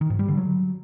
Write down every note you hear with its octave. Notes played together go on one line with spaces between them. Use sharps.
D#3
G#2
G3
D3
F#3